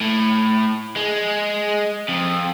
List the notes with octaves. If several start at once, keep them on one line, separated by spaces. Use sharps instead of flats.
A2
G#3
F2